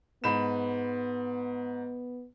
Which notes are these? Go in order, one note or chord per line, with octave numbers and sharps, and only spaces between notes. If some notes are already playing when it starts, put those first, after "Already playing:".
G#2 B3 B5 E7